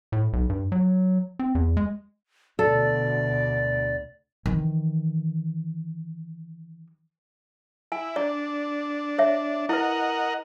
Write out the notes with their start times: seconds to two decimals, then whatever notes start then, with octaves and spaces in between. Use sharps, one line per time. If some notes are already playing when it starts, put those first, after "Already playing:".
0.12 A2
0.33 B1
0.49 G2
0.72 F#3
1.39 C4
1.55 E2
1.77 G#3
2.59 D2 B2 A4 D5
4.46 D#3 E3
7.92 E4 G#5
8.16 D4 D5
9.18 C#5 E5
9.69 E4 A#4 B4 D#5 F#5